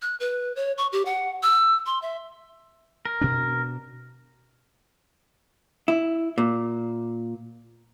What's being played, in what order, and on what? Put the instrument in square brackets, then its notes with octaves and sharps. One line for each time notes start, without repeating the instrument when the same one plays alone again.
[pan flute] F#6
B4
C#5
C#6
G4
F#5
E6
C6
E5
[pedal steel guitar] A#4
[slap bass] B2 C4 D4
[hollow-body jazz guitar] E4
A#2